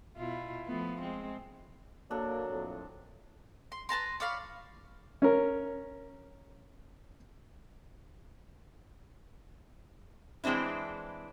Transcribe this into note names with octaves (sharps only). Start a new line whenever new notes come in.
B2 E4 F4
F3 A3 B3
G#3 C4
F#3 A#3 D4 A4
F2 A2
C6
B4 A5 A#5 C6
C#5 D5 F5 B5
C#4 A#4
E3 G#3 C4 D4 E4